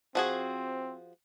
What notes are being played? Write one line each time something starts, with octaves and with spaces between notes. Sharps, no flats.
F3 C4 F#4 G#4